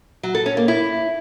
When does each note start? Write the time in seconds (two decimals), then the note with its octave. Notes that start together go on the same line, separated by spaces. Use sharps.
0.23 F#3
0.35 A4
0.46 C#4
0.57 A#3
0.68 E4